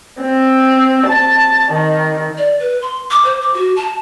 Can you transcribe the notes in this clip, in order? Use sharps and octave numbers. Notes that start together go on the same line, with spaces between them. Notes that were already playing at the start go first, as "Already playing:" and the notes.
C4
A5
D#3
D5
B4
C6
D6
C5
D6
F#4
A5